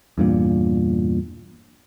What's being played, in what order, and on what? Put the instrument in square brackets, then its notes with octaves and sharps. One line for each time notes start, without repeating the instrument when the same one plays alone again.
[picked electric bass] E2 G2 A#2